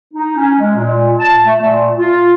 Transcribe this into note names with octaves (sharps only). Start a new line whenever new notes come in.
D#4
C#4
G#3
A#2
A5
A3
A#2
F4